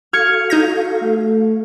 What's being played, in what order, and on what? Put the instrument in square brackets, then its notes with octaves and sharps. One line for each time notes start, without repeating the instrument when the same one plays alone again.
[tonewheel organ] F#4 A4 F5 [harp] F6 G#6 C#7
[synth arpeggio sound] D#4 G6 A#6
[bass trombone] A3